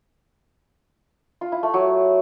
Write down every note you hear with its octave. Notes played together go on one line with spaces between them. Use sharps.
F4
E4
A3
F#3